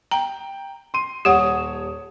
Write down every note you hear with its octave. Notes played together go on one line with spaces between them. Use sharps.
G5 A#5
C6 D#7
D#1 G4 C#5 F#5 D#6